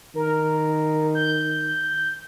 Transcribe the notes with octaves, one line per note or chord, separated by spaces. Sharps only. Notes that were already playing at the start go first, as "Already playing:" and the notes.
D#3 A#4
G6